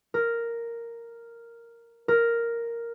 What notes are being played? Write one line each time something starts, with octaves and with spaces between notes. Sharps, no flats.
A#4
A#4